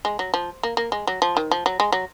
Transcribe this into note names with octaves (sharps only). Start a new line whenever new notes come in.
G#3
F#3
F3
A#3
A#3
G#3
F#3
F3
D#3
F3
F#3
G#3
F#3